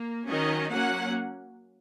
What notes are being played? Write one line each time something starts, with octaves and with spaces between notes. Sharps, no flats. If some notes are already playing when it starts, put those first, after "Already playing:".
Already playing: A#3
D#3 F#3 C#4 D#5
F#3 A#3 C#4 F#5